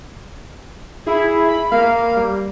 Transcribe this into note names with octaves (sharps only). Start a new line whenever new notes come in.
E4 G#4
B5
A#3 F5
G3